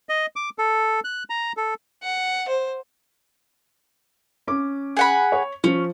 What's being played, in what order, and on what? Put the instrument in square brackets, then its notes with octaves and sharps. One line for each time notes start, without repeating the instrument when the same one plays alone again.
[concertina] D#5
D6
A4
F#6
A#5
A4
[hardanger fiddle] F#5
C5
[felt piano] C#4 D6
[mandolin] G#4 F#5 B5
[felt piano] C#5
[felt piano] F3 [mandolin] C#4